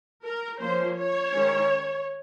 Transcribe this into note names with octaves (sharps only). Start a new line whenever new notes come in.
A#4
F3 A#3 C#4 C5
C#5
D#3 G#3 C#4